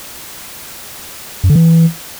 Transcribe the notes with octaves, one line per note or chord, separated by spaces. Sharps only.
F#2
D3
E3